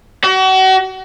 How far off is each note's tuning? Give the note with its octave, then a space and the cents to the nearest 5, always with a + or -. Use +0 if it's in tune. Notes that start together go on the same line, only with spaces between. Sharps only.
F#4 +35